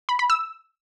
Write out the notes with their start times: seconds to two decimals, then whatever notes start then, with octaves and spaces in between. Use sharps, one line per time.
0.09 B5
0.19 B5
0.30 E6